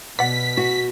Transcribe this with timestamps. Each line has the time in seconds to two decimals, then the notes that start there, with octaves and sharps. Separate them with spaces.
0.19 B2 D5 F#5 B6
0.57 F#4